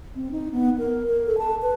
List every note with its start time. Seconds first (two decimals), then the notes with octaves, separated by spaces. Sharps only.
0.16 C4
0.32 D#4
0.52 B3
0.78 A#4
1.06 A#4
1.26 A4
1.38 A5
1.62 B4